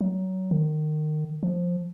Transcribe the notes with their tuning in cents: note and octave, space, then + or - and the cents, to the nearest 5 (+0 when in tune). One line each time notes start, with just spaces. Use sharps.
F#3 +20
D#3 -25
F3 +10